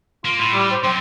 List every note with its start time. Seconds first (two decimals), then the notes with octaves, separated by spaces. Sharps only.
0.25 A#3 F4
0.39 A2
0.53 G3
0.71 C5
0.84 F#2 C4